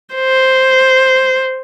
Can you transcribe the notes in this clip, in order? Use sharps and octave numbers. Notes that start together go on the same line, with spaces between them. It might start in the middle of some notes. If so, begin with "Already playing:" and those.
C5